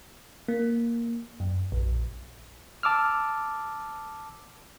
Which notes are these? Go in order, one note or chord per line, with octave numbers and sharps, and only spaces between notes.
A#3
F#2
A#1
A5 D6 E6 F6